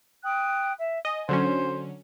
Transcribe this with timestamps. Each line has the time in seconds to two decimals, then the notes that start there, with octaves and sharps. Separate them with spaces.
0.23 G5 D#6 F#6
0.77 E5
1.05 D#5 G#5
1.29 D3 F#3 C#4 C5